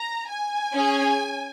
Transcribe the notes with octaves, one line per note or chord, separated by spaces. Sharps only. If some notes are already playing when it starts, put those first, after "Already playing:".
Already playing: A#5
G#5
C#4 G#4